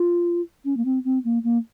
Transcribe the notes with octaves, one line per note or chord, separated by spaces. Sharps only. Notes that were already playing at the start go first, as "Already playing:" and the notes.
Already playing: F4
C#4
A#3
C4
C4
A#3
A#3